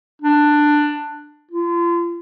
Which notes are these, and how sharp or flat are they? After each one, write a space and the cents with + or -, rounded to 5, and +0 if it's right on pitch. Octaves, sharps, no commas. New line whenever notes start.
D4 +10
F4 -35